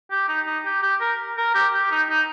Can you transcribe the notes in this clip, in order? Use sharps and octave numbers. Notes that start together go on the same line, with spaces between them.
G4
D#4
D#4
G4
G4
A#4
A#4
G4
G4
D#4
D#4